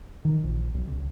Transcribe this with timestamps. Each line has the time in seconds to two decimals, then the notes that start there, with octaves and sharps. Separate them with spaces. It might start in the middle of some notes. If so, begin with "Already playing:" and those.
0.25 D#3
0.44 A#1
0.74 B1
0.87 C#2